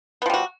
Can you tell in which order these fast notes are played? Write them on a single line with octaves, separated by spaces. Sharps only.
B3 F3 G3 F#4